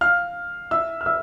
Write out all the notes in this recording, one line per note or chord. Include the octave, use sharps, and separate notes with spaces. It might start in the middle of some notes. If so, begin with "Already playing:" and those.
F5 F6
E5 E6
F6
E5 E6